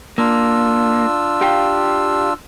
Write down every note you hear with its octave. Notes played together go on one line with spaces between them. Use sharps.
A#3 D4 F4 E6
G4 F5 G5